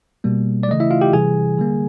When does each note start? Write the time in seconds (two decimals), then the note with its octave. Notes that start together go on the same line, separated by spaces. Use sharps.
0.24 B2 G3 A#3
0.63 D5
0.69 C#3 E3 A3 D#5
0.80 E4 E5
0.90 F4 F5
1.01 G4 G5
1.13 C3 E3 G3 G#4 G#5
1.58 D3 G3 A#3